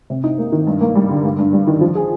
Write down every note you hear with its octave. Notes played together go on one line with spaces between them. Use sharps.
C3
D#4
A#3
D#3
G2
A#3
G3
D3
G2
G2
G3
D#3
F3
G#4